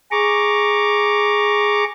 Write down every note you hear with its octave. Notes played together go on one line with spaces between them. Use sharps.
G#4 A#5 C#6 D6